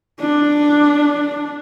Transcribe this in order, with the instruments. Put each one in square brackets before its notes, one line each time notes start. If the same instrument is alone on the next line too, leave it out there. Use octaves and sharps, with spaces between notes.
[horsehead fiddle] D4